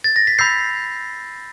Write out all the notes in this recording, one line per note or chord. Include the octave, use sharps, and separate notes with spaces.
A6
A#6
B6
B5 E6 G6 C7